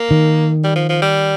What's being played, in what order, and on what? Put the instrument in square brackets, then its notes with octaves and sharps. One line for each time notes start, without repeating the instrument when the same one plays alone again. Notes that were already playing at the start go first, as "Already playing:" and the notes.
Already playing: [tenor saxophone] A#3
[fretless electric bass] D#3
[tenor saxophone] G3
F3
F3
G3